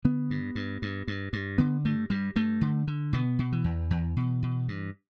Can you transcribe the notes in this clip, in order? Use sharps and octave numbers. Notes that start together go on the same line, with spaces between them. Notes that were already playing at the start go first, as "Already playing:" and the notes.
D3 B3
G2
G2
G2
G2
G2
D3 B3
G2 A3
G2 G3
G2 A3
D3
D3
B2 B3
B2
E3
E2
E2
B2
B2
G2